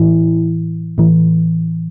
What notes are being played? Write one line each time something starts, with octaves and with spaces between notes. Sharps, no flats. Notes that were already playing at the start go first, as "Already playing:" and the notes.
Already playing: A2 E3 E4
A2 E3